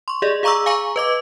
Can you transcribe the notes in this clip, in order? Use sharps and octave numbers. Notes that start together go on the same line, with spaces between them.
C6 C#6
G4 G#4 D5 D#5
G#4 F5 A#5 C#6 D6 E6
F5 G#5 A#5 C#6
B4 D#5 D6